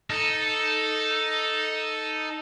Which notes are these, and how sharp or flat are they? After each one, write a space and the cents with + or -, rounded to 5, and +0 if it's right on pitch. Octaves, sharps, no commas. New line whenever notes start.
D#4 +0 A4 +0